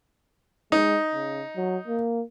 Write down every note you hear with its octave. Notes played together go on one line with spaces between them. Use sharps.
G#3 D#4
C#3
F#3
A#3